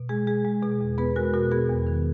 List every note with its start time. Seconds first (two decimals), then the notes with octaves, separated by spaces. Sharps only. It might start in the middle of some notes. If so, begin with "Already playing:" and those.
Already playing: B2
0.09 G#3 G#4
0.27 G#3 G#4
0.45 G#3
0.63 B2 G#4
0.81 E2
0.98 B3 G#4 B4
1.16 G#3 F#4 A#4
1.33 B2 F#4 A#4
1.52 B3 G#4
1.69 E2
1.87 D#3